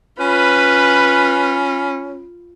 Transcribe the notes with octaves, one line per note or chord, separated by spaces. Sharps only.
C#4 F4 B4 B5